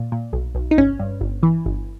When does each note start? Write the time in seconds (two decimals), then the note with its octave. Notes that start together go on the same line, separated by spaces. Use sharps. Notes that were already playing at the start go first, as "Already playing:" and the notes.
Already playing: A#2
0.12 A#2
0.33 B1
0.55 B1
0.71 D#4
0.78 G1 C#4
0.99 G2
1.21 G1
1.43 E3
1.66 G1